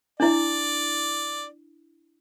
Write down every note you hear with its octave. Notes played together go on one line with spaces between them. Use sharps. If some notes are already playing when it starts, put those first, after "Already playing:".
D4 E4 D5